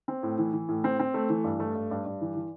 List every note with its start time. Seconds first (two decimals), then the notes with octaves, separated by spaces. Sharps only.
0.08 C4
0.23 A2
0.38 E3
0.53 E3
0.69 A2
0.84 C4
0.99 C4
1.14 A3
1.29 E3
1.44 G2
1.60 A3
1.75 G2
1.91 G2
2.06 G2
2.21 E3
2.35 E3